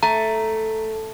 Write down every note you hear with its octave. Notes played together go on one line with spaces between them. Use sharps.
A3 A#5